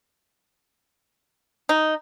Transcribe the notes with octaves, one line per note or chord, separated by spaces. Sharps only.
D#4